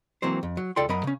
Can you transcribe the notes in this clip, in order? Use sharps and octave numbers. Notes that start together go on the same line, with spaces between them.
E3 F#3 A#3 C4 C5
F2
F#3
C#2 F4 A4 D5 G5 C6
F#2 F#3 A#4 D#5 B5
C#3 C#4